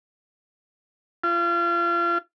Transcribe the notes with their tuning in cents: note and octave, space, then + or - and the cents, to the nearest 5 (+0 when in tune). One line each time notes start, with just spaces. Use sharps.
F4 -35